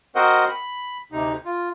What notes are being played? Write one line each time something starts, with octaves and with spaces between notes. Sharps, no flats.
C4 F#4 A#4 C5 D#5 F#5
B5
D2 C3 D#4
F4